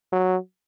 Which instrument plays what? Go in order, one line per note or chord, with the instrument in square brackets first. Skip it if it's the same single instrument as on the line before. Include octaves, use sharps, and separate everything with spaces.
[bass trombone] F#3